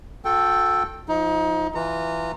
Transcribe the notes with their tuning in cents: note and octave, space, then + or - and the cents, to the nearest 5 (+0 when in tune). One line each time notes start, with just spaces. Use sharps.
F#4 -45 A4 +0 G5 +0
F3 +0 D#4 +30
E3 +0 F4 +10 A#5 -30